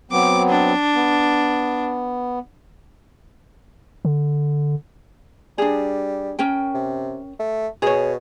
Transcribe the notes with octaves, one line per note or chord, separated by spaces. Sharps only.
F#3 B3 C4 D6
D4
B3
D3
G3 D4 G#4
C#4 A#4 G5
C3
A3
B2 G#4 C#5